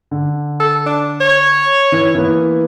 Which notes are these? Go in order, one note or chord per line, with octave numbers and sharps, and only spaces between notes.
D3
A4
D4
C#5
E3
E3 A#3 B3